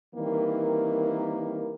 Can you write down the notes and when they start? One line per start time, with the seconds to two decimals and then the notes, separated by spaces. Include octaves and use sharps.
0.15 D#3 E3 G3 A#3 C4 A#4